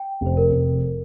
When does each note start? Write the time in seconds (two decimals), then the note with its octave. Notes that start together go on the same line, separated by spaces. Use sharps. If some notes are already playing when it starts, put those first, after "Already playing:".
Already playing: G5
0.21 F1
0.26 C5
0.37 A#4
0.52 F1